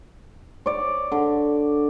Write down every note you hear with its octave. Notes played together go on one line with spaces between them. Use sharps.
C#5 D5
D3